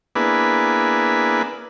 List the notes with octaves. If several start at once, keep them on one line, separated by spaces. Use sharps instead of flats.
A#3 B3 D4 E4 G#4 B4